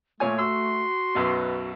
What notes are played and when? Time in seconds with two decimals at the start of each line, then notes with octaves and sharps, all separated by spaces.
0.20 A#2 A3 F4 C#5 G#5
0.39 F#4 C6 E6
1.15 B1 F#2 B2 B4